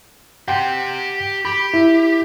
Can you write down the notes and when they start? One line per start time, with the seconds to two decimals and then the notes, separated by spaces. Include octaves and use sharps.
0.48 G4 F#5 G5 C6
1.45 G4 B5
1.74 E4